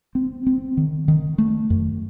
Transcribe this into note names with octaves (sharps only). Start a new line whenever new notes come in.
C4
C4
D#3
D#3
A3
F#2